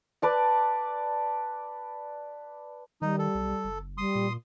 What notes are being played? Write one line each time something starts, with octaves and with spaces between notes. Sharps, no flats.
B4 D5 A5
D#3 G3 D#4
A4
B1
F#1
G3 C6 D#6
A#2